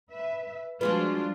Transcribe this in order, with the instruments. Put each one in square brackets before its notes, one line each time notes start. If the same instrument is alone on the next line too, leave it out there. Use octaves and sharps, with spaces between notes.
[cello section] B4 E5
[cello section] F3 G3 G#3 [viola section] D4 F4 [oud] F#4 G#4 B4